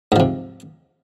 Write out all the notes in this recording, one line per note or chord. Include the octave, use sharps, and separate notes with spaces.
G#2 C3 F3